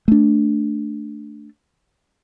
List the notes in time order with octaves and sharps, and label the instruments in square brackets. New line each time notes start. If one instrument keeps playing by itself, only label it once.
[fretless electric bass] A3 D4